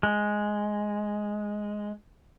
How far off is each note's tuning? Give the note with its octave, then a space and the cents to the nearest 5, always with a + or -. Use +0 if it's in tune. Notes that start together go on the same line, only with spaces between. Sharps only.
G#3 +5